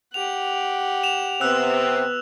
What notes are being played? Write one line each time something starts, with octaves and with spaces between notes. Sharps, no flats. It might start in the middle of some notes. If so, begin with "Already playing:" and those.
G4 F#5 F7
E7 F7
C3 B3 C4 E6 F#6 F7